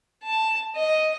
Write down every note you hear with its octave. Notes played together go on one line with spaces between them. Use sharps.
A5
D#5